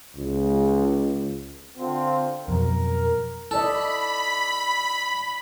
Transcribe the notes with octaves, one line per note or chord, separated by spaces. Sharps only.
C#2
D3 C4 F4
F2 B2 F#3 A#4
E4 A4 D5 D#5 B5